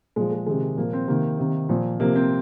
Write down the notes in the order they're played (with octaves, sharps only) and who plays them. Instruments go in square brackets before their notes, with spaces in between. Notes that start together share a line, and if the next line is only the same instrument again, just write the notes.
[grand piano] A#2 F3 G#3
G#3
C3 D#3 G#3
A#2 F3 A#3
C4
C3 D#3 A#3
C3 D#3
A#2 F3
C3 F3 A#3
C4